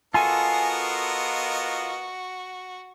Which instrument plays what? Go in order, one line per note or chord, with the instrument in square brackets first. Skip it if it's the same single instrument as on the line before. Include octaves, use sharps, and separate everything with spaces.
[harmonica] B3 A#4 D#5 [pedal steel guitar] F4 A4 [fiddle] F#4 [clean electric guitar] G#5